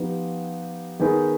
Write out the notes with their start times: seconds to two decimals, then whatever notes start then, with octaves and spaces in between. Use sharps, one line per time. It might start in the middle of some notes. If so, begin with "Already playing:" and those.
Already playing: F3 B3 D#4 G4
1.00 D#3 B3 D#4 G#4 B4